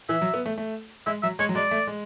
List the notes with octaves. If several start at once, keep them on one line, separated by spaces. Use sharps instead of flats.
E3 E5
F#3
B3
A3
A3
G#3 E5
F#3 E5
G#3 C#5
F#3
G#3 D5
A3
G#3